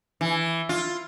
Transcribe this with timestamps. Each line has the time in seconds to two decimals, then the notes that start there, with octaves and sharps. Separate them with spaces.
0.21 E3
0.69 F4